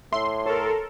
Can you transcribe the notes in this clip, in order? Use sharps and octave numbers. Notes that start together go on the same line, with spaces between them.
A2 E5 C6
A4 A#4 C#5